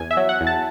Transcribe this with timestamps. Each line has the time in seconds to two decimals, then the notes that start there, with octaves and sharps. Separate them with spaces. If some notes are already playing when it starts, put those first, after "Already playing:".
Already playing: E2 G#5
0.11 E5
0.17 F#3
0.29 F#5
0.41 E2
0.47 A5